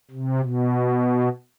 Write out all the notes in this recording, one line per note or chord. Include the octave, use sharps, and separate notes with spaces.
C3
B2